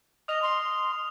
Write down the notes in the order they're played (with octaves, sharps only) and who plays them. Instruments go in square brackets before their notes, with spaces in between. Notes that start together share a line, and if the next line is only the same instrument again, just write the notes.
[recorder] D#5 [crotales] D#6 F6 F7
[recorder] C6